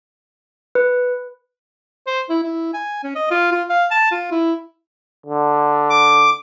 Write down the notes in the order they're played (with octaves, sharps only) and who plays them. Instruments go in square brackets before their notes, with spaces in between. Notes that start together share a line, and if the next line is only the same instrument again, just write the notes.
[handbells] B4
[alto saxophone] C5
E4
E4
G#5
C#4
D#5
F4
F4
F5
A5
F4
E4
[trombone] D3
[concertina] D6